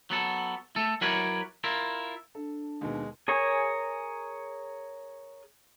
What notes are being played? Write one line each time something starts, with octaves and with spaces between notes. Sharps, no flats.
F#3 B3 A4
A3 A4
F#3 E4 A#4 B4 C#5 D5
E4 F4 A#4
D4 A4
D#2 B2 G#3
G#4 A#4 C#5 G#5